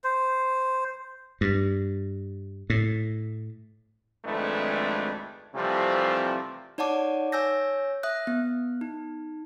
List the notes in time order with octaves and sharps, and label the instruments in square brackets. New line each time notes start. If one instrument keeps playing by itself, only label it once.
[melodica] C5
[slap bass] G2
A2
[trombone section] G#1 F2 G#3 A3 D4 B4
C3 E3 F3 G3 A3 C4
[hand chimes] D#4 C#5 D5 F#5 A5 D6
C#5 G#5 E6 G6 A#6
E5 D#6 F#6
B3
D#4